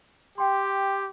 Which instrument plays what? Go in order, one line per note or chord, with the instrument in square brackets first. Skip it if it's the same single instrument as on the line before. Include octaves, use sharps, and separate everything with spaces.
[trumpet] G4 [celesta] G5 C6